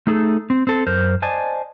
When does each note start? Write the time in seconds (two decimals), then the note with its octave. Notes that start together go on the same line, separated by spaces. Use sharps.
0.07 A3 D#4 G#4 A4
0.50 C4
0.67 C4 A4
0.87 F#2 A#4 C5
1.22 C5 D5 D#5 G#5 A5